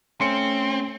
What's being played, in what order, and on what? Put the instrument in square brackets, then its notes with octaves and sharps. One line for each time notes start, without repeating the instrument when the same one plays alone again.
[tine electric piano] A3 C#4 [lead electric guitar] C4 [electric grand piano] C6 C#7